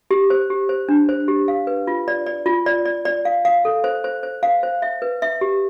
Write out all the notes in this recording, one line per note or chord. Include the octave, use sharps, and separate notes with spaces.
G4
C5
G4
C5
D4
C5
G4
F5
B4
F4
D5
D5
F4
D5
D5
D5
F5
F5
A4
C5
C5
C5
F5
C5
E5
B4
E5
G4